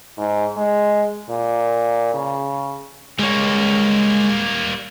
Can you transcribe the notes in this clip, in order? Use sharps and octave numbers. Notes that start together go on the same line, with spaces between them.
G#2
G#3
A#2
C#3
G3 G#3 A#3 C#5